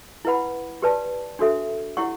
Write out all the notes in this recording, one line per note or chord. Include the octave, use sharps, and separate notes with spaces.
E4 B4 F#5 B5
G4 B4 D5 A5
D4 F#4 A4 E5
E4 G4 C#5 F#5 C#6